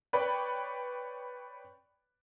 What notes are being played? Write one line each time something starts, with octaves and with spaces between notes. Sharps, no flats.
B4 C#5 D5 G5 B5